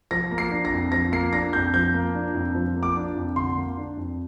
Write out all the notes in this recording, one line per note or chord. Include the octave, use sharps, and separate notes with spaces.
F3 A#6
A#3
C7
D4
A#6
F2
F3 A#6
A#3 C7
D4 A#6
F2 G6
F3 G6
A#3
D4
F2
F3
A#3
D6
D4
F2
D3 C6
A#3
D4
F2